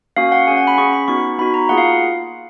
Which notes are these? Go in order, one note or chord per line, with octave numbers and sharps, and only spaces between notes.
A#3 C#4 F#4 F5
F#5
C#4 G#4 G#5
F#5
B5
C#4 G#4 C#6
B5
B3 D#4 F#4 C#6
B3 D#4 F#4 B5
A#5
A#3 F4 G#4 F#5
F5